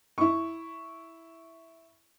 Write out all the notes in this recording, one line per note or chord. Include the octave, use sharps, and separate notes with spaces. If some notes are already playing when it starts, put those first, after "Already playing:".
E4 C#6